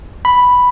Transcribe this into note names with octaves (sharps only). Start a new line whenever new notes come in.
B5